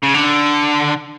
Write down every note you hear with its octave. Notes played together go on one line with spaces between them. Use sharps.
C#3
D3